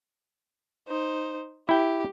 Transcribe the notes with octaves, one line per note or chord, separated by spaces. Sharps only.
D#4 C5
E4 G4 G5